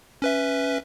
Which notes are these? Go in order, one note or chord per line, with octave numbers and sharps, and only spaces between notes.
C#4 B4 E5